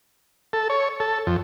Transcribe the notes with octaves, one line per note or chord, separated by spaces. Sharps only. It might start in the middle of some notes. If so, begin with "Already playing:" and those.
A4
C#5
A4
F2